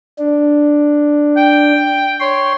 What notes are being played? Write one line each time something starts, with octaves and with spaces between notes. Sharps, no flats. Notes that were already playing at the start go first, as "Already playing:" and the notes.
D4
G5
C#5 C6